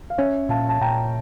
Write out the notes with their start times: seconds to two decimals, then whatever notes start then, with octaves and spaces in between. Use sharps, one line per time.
0.10 F5
0.18 C#4 C#5 E5
0.49 A#2 F5 A5
0.69 A5
0.81 A#2 G5 A#5